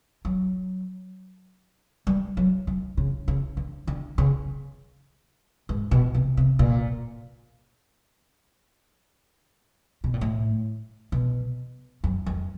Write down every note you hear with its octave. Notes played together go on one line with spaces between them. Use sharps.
F#3
G3
F#3
D#3
C#3
C#3
D3
D3
C#3
G#2
B2
C3
C3
A#2
B2
A#2
A2
B2
F#2
F2